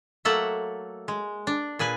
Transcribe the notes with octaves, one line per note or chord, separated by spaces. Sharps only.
F#3 A3 A#3 A4 E5 F#5
G#3
D4
A#2 G#4 B4 G#5